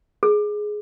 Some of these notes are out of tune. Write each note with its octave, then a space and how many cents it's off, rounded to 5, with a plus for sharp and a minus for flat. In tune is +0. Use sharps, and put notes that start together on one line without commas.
G#4 +10